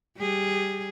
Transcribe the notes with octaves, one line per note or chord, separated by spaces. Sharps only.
G3 G#4